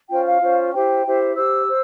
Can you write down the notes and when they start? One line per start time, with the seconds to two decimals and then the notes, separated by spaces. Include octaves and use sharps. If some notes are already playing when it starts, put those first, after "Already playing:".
0.09 C#4 F4 C5 G5
0.25 F5
0.40 C#4 F4 C5
0.72 E4 G4 C5 G5
1.04 E4 G4 C5
1.36 G4 C5 E6
1.68 C5